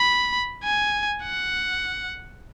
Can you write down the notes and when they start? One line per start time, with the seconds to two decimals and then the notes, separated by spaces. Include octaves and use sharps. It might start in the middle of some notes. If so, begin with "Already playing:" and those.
Already playing: B5
0.64 G#5
1.23 F#5